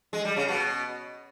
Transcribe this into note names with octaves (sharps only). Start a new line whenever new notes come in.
G#3
G3
C#3
B2